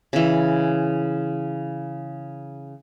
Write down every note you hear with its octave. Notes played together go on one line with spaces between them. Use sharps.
C#3 E3